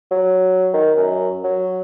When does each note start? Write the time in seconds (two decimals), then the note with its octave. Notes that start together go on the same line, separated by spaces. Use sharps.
0.11 F#3
0.73 D#3
0.97 F#2
1.44 F#3